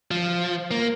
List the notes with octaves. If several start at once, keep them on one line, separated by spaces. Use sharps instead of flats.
F3
A#3